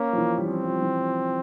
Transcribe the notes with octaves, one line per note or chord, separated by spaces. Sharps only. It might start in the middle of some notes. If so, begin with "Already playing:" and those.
Already playing: A#3 C#4
F3
E3
G3
F3 C4
F3
E3